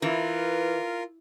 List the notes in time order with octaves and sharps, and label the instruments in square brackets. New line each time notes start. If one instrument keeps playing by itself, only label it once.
[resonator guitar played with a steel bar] E3 [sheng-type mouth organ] F4 A#4 [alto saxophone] B4